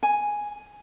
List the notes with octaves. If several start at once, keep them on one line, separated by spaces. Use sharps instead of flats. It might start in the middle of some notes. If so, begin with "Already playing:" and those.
G#5